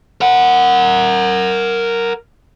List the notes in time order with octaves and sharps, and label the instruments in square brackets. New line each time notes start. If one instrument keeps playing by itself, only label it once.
[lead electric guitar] A#4 F#5